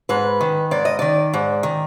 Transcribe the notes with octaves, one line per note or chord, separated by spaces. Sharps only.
G#2 B4
D#3
G#2 D5
D#5
D#3 D5
G#2
D#3